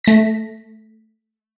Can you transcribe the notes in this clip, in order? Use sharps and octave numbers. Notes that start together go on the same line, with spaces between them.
A3 A#6 B6